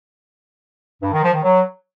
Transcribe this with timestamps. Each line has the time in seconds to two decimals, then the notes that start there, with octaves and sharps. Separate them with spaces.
1.02 G2
1.12 D#3
1.23 F3
1.33 D#3
1.43 F#3